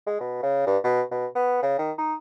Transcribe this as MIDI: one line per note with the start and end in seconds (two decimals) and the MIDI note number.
0.07 0.19 56
0.21 0.43 47
0.43 0.65 49
0.67 0.77 43
0.84 1.02 47
1.12 1.26 47
1.35 1.58 59
1.62 1.79 49
1.79 1.92 51
1.98 2.14 63